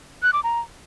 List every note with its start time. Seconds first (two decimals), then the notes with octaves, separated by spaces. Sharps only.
0.23 F#6
0.33 D6
0.44 A#5